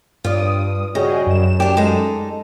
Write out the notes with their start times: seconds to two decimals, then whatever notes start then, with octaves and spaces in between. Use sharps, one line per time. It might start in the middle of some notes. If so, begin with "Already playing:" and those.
0.24 G2 F4 D5 D#6
0.95 C#3 G3 F#4 G#4 D#5
1.27 F#2 E7
1.60 D4 G4
1.77 G#3 D#4 A4